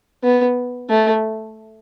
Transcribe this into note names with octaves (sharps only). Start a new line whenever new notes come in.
B3
A3